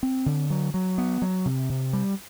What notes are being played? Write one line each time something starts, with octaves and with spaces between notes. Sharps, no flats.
C4
D3
F#3
F#3
B3
F#3
C3
C3
G3